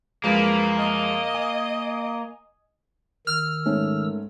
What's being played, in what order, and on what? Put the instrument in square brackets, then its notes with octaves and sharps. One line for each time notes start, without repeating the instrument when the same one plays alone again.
[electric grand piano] F#2 F3 G#3 [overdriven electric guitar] A#3 [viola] A#4 B4
[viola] D#5
[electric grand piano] G#5
[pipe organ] D#3 E6 [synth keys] F6
[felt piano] G#2 A3 C#4